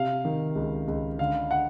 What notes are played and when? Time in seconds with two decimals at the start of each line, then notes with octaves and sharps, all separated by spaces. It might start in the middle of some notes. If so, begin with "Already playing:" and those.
Already playing: C3 F5
0.25 D#3
0.56 C#2
0.88 C#2
1.19 D3 F5
1.51 F#5